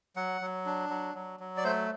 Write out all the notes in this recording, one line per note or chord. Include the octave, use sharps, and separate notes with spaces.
F#3 F#5
F#3
D4
F#3
F#3
F#3
D5
A3 C5